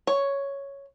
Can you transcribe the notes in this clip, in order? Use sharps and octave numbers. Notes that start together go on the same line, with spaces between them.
C#5